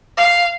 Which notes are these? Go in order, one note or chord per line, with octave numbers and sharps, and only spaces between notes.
F5